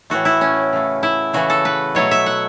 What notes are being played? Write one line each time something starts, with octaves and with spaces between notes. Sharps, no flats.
A2 E3 A3 F#4
E4
C#4
C#3 A3
E4
C#3 E3 A3 F#4
A4
B4
B2 F#3 A3 C#5
E5
F#5